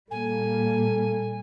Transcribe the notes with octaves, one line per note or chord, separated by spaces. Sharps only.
A#2 G3 A#3 A4 G#5